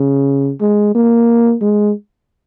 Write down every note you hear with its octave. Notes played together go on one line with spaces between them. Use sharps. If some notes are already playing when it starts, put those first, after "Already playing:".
Already playing: C#3
G#3
A#3
G#3